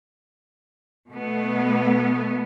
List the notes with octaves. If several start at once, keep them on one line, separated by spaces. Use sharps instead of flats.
B2 A3 B3